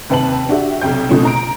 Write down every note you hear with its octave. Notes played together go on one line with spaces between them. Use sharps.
D#2 C3 B4 A5 F#7
D4 F#4 G4 E5
B1 C3 G5 G6
B2 D3 F3 A3 C4 C#4
A#5 D7